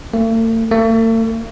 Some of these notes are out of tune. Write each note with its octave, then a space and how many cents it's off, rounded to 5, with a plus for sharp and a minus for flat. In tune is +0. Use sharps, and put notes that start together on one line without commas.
A3 +45
A3 +45